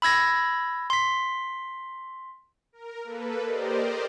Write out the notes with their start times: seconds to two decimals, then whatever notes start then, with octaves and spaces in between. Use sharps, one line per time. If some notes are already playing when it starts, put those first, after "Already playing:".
0.02 B5 E6 G#6 A#6
0.90 C6 B6
2.73 A#4
3.04 A#3 A4 B4
3.45 G4 A#4 C5 D5 D#5